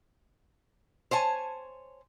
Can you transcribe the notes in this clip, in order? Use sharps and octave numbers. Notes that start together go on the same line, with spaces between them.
C5 C#5 G#5 A5